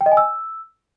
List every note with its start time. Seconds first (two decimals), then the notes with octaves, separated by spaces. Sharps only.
0.01 G5
0.06 D#5
0.12 G#5
0.17 E6